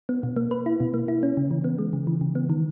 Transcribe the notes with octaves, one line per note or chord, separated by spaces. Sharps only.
B3
B2
A#3
B4
E4
B2
A#3
E4
C#4
C#3
E3
B3
G#3
C#3
E3
C#3
B3
D#3